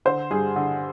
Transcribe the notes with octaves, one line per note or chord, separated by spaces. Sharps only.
D3 C5
G2 G#4
D3